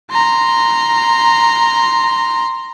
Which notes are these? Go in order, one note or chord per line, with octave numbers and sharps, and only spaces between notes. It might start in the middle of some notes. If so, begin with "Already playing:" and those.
A#5 C6